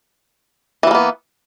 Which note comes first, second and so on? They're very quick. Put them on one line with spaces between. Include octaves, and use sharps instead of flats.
E3 G3 A#3 B3